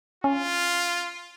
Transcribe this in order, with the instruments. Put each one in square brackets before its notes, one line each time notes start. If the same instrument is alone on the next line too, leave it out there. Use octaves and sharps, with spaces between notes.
[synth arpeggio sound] C#4 [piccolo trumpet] F4